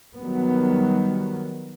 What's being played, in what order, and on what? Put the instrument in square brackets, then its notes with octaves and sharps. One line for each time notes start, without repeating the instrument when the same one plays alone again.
[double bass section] D#3 F#3 G3 B3